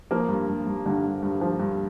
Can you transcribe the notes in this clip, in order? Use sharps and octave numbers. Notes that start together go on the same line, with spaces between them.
F3 A#3
G2
G2
G2
G2 D3 D4
G2
G2
F3
G2